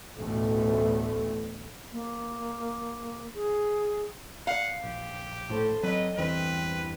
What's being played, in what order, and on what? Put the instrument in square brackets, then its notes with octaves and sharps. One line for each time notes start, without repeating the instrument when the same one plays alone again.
[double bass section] A1 D2 B2 A3
[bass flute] A#3
G#4
[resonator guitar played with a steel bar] F5 [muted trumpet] F#5
[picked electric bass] A#1 [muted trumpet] G4
[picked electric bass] A#1 A2 [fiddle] A4 C5
[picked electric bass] F#3 C4 [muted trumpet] B4 [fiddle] D#5
[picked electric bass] E2 G2 E3 [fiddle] C4 [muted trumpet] B4